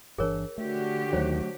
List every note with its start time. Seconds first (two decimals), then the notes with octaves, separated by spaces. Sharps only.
0.18 G1 E3 D4 G#4 A#4 C#5
0.58 D3 A3 F#4 G4
1.13 D#2 D#3 F#3 A3 C5 C#5